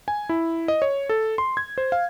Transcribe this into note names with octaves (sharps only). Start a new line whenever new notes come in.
G#5
E4
D#5
C#5
A4
C6
G#6
C5
F5